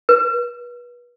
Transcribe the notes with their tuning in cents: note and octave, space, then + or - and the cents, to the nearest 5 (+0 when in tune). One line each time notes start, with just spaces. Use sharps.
B4 -30